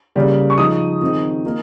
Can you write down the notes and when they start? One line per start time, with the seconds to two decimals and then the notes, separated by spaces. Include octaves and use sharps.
0.16 C#3 G3 A#3
0.50 C#6
0.58 F3 G#3 D#4 D#6
1.01 D#3 G#3 C4 D#4
1.45 A#3 D#4